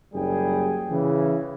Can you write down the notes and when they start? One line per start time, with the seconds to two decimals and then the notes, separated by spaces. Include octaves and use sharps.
0.13 F#1 F#2 G3 G#4 G5
0.90 C#3 E3